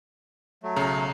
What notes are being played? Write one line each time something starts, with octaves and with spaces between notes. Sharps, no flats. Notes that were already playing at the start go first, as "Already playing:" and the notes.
F#3 A3
B1 C#3 A#5